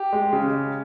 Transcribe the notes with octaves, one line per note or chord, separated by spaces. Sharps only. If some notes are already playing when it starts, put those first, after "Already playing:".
Already playing: G4
G#3
C#3